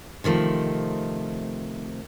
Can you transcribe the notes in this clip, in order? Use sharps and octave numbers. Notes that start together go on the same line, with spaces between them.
C3 D#3 F3 A3